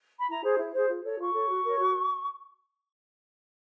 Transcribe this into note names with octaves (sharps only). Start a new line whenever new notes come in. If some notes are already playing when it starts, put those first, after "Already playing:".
B5
E4 A#5
G#4 C5
E4
G#4 C5
F4
A4 C#5
F4 C#6
A4 C#5
F#4
A#4 C#5
F#4